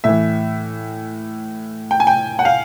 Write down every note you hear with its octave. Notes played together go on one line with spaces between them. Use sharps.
A2 E3 E5
G5
G#5
G5
F#5
F5